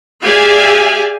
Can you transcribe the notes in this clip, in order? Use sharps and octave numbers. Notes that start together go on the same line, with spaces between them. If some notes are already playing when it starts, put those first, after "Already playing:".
G4 G#4 D5 E5 F5 G#5